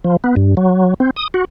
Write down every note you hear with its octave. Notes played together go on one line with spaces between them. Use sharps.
F3
B3
G2
F#3
C4
D#6
F#4